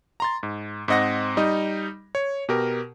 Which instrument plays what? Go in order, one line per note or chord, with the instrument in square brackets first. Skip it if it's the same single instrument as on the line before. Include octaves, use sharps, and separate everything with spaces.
[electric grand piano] A#5 C6 A6
G#2
G#2 C4 D#5 F#5 A#6
G3 D#4 D#5
C#5
B2 G4 A#4